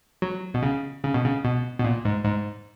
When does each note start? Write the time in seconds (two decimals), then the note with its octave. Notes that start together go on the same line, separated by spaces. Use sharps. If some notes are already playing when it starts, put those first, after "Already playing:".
0.22 F#3
0.54 B2
0.63 C#3
1.04 C#3
1.14 B2
1.25 C#3
1.45 B2
1.79 B2
1.84 A#2
2.05 G#2
2.25 G#2